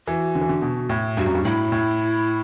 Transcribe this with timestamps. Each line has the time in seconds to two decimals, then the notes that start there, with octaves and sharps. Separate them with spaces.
0.07 E3 F#4
0.35 D3
0.41 E3
0.49 D3
0.62 B2
0.89 A2
1.17 G2 F#4
1.26 F#2
1.35 G2
1.44 A2 E4
1.72 A2